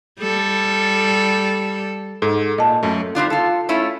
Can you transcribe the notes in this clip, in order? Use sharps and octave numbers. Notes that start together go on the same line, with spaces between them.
G3 A4
G#2 A4
A#2 D#5 A5
F#2 A3
G3 C4 D4 F4
F4 A4
A3 C#4 E4 F4